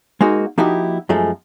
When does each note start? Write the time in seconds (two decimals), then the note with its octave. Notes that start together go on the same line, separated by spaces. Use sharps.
0.21 G#3 A#3 D#4 F#4
0.58 F3 A#3 D#4 E4 F#4 G4
1.09 F#2 F3 G#3 A3